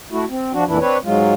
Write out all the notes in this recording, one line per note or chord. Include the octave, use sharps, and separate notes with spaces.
A3 E4 F#4
C4
F3 D4 F#4
F2 A#2 E3 D4 E4
C4 D4 B4 C#5
G#2 F#3 G#3 F4